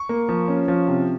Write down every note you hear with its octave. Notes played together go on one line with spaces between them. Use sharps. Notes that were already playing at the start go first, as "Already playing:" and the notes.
Already playing: C#6
A#3
F3
C#4
F3
C3